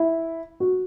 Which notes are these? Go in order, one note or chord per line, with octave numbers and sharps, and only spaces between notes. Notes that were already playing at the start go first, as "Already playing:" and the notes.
Already playing: E4
F#4